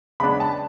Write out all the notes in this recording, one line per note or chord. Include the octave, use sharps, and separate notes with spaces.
C#3 G#3 B3 D4 B5
A5